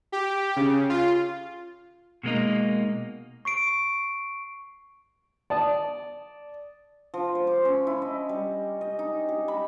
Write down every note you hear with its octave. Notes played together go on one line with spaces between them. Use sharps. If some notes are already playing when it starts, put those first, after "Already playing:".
G4
C#3
F4
B2 G#3 A#3 D#4
C#6 C7 D7
D5 A5 D#6
F3
C5
D6
C#4
E4
D#5
G3
D#5
D#4
G4
B5